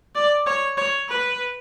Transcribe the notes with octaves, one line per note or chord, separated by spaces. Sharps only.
D5
C#5
C#5
B4